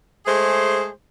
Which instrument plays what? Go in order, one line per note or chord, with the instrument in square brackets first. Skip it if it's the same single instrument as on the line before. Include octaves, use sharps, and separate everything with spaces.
[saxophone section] G#3 A3 G#4 C5